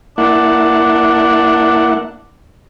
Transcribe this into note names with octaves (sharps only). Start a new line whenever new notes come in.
A#3 D4 E4 F#5